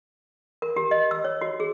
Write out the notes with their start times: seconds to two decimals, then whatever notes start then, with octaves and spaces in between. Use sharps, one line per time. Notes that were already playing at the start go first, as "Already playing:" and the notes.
0.62 A#4
0.76 G4
0.91 D#5
1.11 E6
1.24 C#5
1.41 F#4
1.60 G#4